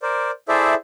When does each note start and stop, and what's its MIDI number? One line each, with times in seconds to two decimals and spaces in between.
0.02 0.31 70
0.02 0.31 72
0.02 0.31 74
0.49 0.74 64
0.49 0.74 68
0.49 0.74 69
0.49 0.74 72
0.49 0.74 74
0.49 0.74 76